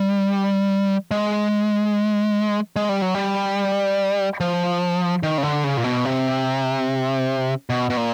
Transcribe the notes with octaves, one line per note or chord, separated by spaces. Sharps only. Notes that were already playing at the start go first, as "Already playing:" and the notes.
Already playing: G3
G#3
G#3
G3
F#3
G3
F3
D#3
C#3
D3
C#3
A#2
B2
C3
B2
B2
A#2